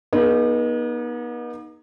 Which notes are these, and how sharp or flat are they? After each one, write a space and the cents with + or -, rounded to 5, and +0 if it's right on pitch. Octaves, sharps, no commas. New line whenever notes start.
B3 -45 D#4 +0 G#4 +15